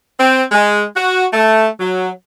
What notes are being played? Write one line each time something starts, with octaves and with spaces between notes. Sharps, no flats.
C4
G#3
F#4
A3
F#3